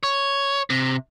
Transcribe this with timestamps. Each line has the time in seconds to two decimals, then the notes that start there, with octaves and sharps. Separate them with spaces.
0.03 C#5
0.70 C3